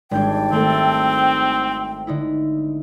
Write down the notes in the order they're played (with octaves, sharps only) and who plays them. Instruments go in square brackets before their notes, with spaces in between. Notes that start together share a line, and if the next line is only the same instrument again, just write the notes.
[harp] G#1 G6 G#6 [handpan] G3 G#3 D4 [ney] G5
[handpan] D#3 A3 A4 [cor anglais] C4
[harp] D3 D#4 E4